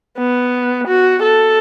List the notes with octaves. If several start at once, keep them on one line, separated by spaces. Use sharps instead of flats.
B3
F#4
A4